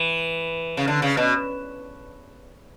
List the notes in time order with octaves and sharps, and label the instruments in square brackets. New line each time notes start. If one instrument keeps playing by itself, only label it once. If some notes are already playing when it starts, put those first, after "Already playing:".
Already playing: [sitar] E3
C#3
D3
C#3
B2